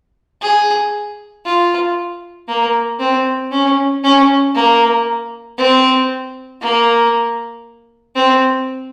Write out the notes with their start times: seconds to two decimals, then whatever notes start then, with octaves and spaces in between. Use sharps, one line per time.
0.42 G#4
1.45 F4
2.48 A#3
2.99 C4
3.52 C#4
4.04 C#4
4.55 A#3
5.58 C4
6.61 A#3
8.16 C4